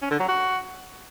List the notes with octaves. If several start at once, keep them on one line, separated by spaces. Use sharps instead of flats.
C#4
D3
F#3
F#4